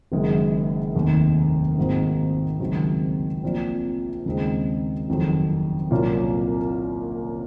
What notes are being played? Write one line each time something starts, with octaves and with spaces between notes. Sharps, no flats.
F#1 F#2 D#3 G#3
F1 D#2 D#3
G#1 G#2 D#3 A#3 F4
C#2 C3 D#3 F#3
A#1 A#2 F3 C4
D#2 C#3 G#3 C4 D#4
F#1 F2 D#3 F#3
C2 A#2 F#3 A#3 C#4